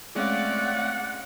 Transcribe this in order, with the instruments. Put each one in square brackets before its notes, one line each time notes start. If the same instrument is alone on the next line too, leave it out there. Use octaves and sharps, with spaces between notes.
[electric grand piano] G#3 C#4 F5 [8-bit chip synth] A3 C4 [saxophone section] D5 [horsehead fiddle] F#5